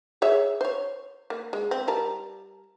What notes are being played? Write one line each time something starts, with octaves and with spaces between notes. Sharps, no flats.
G#4 C#5 E5
C5 C#5
A#3
G#3
C4
G3 A#4 A5